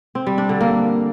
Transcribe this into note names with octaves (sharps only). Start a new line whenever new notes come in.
C4
G3
D4
D3
A#3